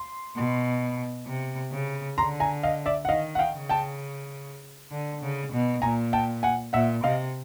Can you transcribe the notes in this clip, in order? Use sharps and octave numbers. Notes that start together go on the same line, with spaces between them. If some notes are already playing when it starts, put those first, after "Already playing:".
Already playing: C6
B2
C3
C#3
D3 A#5 C6
G#5 A#5
D#5 F5
D5 E5
F#5
D#3 D#5 F5
F#5
F5 G5
C#3
G5 A5
D3
C#3
B2
A#2 G#5 A#5
G5 A5
F#5 G#5
A#2 E5 F#5
C3 D#5 F5